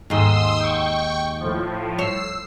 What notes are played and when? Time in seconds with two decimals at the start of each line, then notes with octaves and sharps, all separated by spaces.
0.10 D#2 G#2 C6 D#6 E6
0.60 G5 C#6
1.40 A2 F3
1.99 C#5 E6 C7